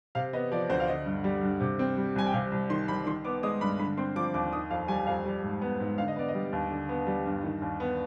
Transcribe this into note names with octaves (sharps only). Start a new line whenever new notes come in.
C3 F5
B3 D#5
F3 D5
D2 C5
F5
D3 D#5
G2
G3
G2
C3
C4
G3
C2 G#5
G5
C3 F5
C2
D#3 C6
C2 B5
D#3 C6
B3 D6
G#3 D#6
G2 B5
D3 B5
C4 C6
F3 D6
D#2 D6
D#3 D#6
F2 F5
G3 G#5
F2 F5
G3
G#2
B3
G#2
D3 F5
D#5
B3 D5
D#5
G3
D#2
D3
B3
G3
G2
D#3
D#2
B3